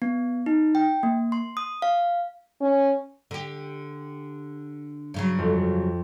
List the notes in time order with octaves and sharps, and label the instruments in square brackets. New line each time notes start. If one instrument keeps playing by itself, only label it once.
[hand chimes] B3
D#4
G5
A#3
C6
D#6
F5
[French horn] C#4
[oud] D3 G4
G2 C#3 F#3
[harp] F2